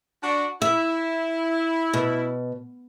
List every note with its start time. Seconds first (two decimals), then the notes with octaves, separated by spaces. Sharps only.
0.23 D4 F#4
0.62 E4 E5
1.93 B2